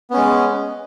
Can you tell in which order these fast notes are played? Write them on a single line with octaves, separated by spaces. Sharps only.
B3 C#4 G#3